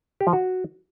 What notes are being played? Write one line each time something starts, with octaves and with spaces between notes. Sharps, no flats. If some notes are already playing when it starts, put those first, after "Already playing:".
G4
F3
F#4